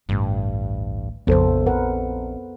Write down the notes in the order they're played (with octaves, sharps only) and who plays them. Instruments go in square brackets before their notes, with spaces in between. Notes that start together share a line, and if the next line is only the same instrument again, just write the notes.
[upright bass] A1 D2 [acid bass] G2
[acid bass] A#1 [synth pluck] F2 [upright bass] C#3 F3 [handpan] B3 A4 C5
[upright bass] C4 [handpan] A#4 B4 F#5